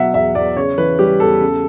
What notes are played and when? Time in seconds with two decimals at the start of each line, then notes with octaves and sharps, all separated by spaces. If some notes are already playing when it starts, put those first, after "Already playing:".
Already playing: B2 F#3 E5 F#5
0.14 E2 E5
0.35 E2 D5
0.56 C#3 C#5
0.78 E3 B4
0.99 G3 G4
1.20 E2 A4
1.41 C#3